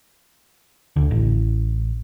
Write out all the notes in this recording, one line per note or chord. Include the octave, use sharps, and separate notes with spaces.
D2
A1